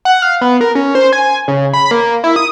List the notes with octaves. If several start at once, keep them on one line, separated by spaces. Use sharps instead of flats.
F#5
F5
B3
A#4
C#4
C5
G#5
C#3
B5
A#3
E4
D#6